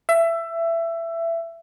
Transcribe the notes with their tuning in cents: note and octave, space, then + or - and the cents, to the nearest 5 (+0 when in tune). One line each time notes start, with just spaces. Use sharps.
E5 +20